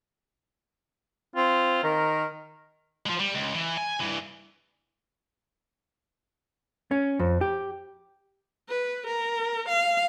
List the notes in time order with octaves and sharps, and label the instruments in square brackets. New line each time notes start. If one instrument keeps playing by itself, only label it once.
[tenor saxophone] C4 [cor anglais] F4
[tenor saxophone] D#3 [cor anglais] A#4
[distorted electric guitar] F3 G#3
G3
C#2
E3
G#5
G2 E3
[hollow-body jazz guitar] C#4
F2
G4
[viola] B4
A#4
F5